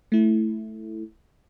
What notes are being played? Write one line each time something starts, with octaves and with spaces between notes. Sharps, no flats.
A3 E4